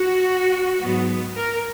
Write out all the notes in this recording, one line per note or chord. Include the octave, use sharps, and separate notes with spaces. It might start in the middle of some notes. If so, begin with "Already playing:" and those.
Already playing: F#4
G#2 F#3 B3
A#4